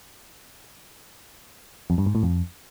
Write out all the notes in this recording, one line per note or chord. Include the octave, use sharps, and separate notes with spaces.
F2
G2
G#2
A2
F2